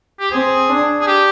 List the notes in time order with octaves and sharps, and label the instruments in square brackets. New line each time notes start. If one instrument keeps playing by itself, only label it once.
[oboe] G4
[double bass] C4 [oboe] G#4
[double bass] D4
[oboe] G#4
G4